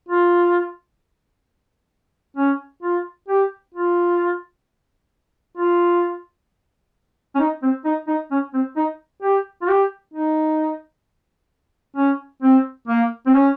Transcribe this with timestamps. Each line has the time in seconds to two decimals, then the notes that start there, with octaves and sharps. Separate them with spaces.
0.08 F4
2.37 C#4
2.83 F4
3.28 G4
3.74 F4
5.57 F4
7.35 C#4
7.39 D#4
7.63 C4
7.85 D#4
8.08 D#4
8.31 C#4
8.54 C4
8.77 D#4
9.22 G4
9.62 F4
9.68 G4
10.13 D#4
11.96 C#4
12.42 C4
12.87 A#3
13.26 C4
13.34 C#4